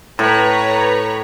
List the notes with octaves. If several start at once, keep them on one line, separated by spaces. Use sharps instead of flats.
A2 B4 C#5 A#5